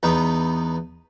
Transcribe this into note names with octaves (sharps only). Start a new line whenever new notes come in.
E2 B3 D#4 B4 G5